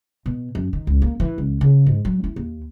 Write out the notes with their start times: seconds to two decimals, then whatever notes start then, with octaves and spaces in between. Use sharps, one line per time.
0.26 B2
0.55 F#2
0.73 D#3
0.87 C#2
1.02 A#3
1.20 E3
1.38 C#2
1.61 C#3
1.86 G#2
2.05 F#3
2.24 E4
2.36 D#2